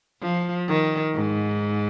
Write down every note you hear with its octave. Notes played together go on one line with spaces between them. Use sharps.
F3
D#3
G#2